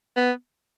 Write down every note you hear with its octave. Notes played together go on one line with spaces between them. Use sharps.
B3